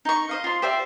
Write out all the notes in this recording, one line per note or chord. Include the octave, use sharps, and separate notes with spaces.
D#4 C#6
C5 D#5 F5
F4 C6
G4 C5 D5 E5